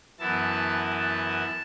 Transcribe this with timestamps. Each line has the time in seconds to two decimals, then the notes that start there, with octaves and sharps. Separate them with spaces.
0.19 F#2 E3 B3 E4 A5
0.96 A5